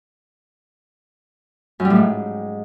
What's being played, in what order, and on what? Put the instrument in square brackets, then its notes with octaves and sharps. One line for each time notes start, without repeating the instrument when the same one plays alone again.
[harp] F#2
G3
A2
G#2